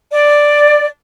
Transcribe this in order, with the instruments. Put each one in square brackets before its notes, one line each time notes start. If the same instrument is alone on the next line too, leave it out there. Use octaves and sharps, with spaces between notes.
[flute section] D5